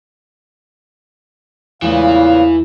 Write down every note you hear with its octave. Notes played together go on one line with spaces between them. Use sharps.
E2 A#2 C#3 E3 A3 B3 F5